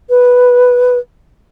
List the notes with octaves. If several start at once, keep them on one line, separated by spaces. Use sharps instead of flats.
B4